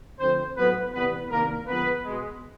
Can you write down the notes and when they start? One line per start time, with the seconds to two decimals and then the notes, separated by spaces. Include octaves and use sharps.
0.19 D3 F3 A3 C4 C5
0.56 A2 F#3 A3 B3 B4
0.93 C3 E3 G3 B3 B4
1.30 C3 D#3 G3 A#3 A#4
1.67 D3 F3 G#3 B3 B4
2.04 B2 G#3